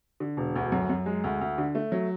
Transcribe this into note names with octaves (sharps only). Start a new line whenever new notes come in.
D3
E1
D2
F#2
F#2
G#3
D2
D2
D3
A3
F#3